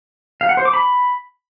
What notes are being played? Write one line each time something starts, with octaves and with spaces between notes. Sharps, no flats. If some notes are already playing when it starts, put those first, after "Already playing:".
F5
F#5
C5
D6
B5